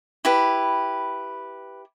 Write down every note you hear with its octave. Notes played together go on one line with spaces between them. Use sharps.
E4 G4 B4